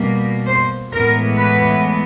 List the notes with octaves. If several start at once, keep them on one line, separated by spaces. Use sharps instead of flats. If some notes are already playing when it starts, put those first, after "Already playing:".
Already playing: B2 G3 A#3
C5
A2 E3 G#3 B3 A#4
B4